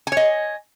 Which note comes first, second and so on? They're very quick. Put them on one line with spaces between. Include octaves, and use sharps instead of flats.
G#5 C#5 D#5